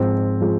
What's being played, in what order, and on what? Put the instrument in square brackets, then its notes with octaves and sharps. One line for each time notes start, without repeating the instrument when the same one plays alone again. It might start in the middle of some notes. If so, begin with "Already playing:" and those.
Already playing: [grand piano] G#2 F3 G#3 C4
F3 G#3